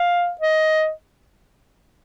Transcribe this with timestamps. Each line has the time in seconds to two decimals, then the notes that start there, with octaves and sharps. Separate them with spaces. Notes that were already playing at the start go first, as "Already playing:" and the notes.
Already playing: F5
0.41 D#5